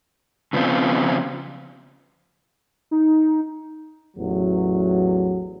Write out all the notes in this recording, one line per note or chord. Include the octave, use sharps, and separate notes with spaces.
C#3 F3 B3 C4 F4
D#4
A1 E2 F#3